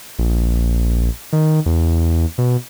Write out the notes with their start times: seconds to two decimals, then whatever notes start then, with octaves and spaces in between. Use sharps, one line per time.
0.19 A#1
1.33 D#3
1.66 E2
2.38 B2